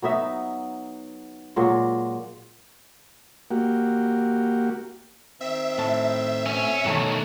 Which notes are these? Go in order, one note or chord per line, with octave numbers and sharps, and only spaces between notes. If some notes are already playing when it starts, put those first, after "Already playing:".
F#3 B3 D#4 E5
A#2 F#3 G#3
A#3 F#4 G4
D#3 C4 E5
A2 A5
B2 C4 C#4
G2 B2 D#3 E3 A3 C#5